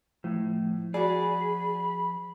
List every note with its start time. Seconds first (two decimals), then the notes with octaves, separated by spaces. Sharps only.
0.24 A2 F3
0.94 F#4 G#4 D5 B5